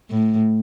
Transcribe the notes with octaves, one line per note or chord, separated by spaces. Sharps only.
A2